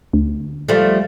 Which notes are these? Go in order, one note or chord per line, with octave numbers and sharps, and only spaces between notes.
D2
F3 G3 A3